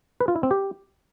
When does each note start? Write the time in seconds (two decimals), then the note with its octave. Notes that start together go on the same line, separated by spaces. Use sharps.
0.20 B4
0.28 F4
0.36 E4
0.43 C4
0.51 G4